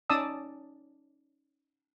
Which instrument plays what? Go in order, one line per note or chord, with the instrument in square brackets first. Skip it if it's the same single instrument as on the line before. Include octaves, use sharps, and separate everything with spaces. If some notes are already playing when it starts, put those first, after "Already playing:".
[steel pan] C#4 D#4 D5 A5 D#6 E6